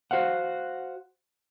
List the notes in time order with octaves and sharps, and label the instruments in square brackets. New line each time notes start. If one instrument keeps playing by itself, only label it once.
[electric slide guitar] F#4 C5 F5 F#5